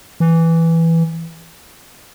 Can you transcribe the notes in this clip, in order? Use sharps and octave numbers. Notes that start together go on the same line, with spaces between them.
E3